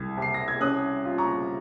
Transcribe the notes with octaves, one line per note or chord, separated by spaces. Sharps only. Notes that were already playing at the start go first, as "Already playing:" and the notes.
Already playing: C2 G#6
C3 C7
A#6
G#6
C#4 D#6 F#6
F4
A#5 C#6